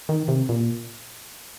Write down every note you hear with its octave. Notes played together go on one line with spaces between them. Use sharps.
D#3
C3
A#2